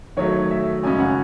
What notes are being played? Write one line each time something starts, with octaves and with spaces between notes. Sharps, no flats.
D#3 F#3 A3 C#5
E5
F#2 C#3 G#3 C#4 G#5
F#5